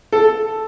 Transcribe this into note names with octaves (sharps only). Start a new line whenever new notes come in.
A4